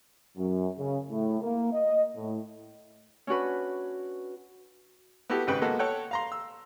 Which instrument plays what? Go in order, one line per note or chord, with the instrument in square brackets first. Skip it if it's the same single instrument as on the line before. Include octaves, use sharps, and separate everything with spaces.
[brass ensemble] F#2
C#3
A2
A#3
D#5
A2
[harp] C#4 D4 F#4 B4
[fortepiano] B3 E4 F#4 G4 A4
G#1 G#2 C#3 B4 G5 B5
G#3 A#3 B3 F#4 A4
A4 C#5 F#5 G5 F#6
F5 A#5 C6
E6